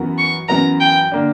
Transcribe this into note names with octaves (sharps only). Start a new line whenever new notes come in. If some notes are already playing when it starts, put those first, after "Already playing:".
Already playing: F#2 E3 B3 F#4 A#4
C#6
F#2 E3 B3 F#4 A#4 A#5
G5
D3 A#3 D4